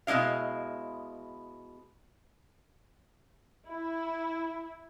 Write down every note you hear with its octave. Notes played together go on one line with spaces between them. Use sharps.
B2 G#3 D#4 E4 F5
E4